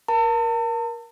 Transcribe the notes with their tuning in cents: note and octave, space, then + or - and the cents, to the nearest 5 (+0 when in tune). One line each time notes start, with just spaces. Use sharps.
A#4 +20 A5 +40